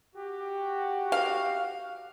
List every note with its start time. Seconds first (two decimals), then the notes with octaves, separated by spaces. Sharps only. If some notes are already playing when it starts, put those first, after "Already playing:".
0.15 F#4 G4
1.12 F5